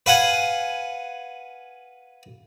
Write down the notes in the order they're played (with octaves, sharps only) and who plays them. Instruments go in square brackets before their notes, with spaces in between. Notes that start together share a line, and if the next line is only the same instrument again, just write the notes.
[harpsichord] B4 F5 F#5 G#5